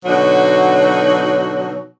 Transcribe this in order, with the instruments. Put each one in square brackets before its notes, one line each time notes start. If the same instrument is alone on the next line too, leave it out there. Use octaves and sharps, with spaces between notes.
[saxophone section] B2 D3 F#3 D#4 F#4